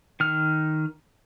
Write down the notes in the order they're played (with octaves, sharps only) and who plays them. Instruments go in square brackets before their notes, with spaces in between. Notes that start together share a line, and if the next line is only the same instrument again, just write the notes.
[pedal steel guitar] D#3 F6